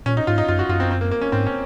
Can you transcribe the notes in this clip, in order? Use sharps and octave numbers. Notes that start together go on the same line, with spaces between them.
A#2 C#4
D#4
G#2 F4
D#4
F#2 F4
F#4
F#2 F4
C4
C4
A#3
A#3
C#4
G#2 C4
C#4